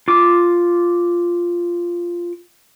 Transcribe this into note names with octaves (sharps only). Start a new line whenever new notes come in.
F4 D6